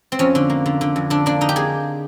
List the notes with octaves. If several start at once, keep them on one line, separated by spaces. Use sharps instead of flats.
C4
F2 C#4
D3
A#3
D3
D3
F2
D3 D4
A#3 D4
D3 D#4
G4
A#3 G#4